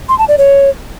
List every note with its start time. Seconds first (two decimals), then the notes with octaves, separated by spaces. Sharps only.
0.09 C6
0.19 A5
0.28 D5
0.38 C#5